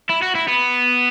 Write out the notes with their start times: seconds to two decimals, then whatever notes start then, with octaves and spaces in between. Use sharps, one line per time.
0.09 E4
0.22 F#4
0.35 E4
0.48 B3